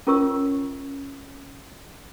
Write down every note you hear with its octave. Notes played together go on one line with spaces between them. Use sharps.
C#4 F4 A#4 C#5 C#6 E6